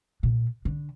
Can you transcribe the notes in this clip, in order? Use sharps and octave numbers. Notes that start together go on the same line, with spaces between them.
A#2
D3